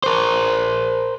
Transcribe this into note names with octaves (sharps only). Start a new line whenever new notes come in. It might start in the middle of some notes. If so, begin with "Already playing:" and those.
A#4 C5